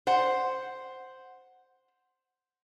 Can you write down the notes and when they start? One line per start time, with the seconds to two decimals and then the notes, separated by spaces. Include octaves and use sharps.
0.07 C5 F#5